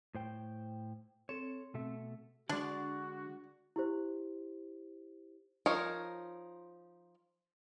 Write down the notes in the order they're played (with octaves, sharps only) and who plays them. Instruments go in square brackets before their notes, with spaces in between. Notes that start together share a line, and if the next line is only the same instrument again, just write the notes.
[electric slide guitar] A2 C5 G5
[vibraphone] C4 [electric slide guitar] A4 C#5
[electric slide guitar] B2 A3 E5
[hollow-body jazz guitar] D3 G#3 [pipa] D4 D5 [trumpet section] F#4
[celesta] E4 G4 C5
[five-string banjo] F3 D#4 A#4 C#5